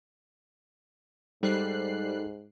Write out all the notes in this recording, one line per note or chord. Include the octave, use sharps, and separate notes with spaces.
G#2 G3 D#4 A4 C5 F#6 C7